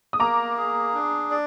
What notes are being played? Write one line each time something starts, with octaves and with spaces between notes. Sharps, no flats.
D#6
A#3 A#5 D6
G#4
D4
D5